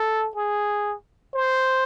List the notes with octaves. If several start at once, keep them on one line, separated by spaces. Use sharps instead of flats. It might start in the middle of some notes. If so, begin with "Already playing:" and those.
Already playing: A4
G#4
C5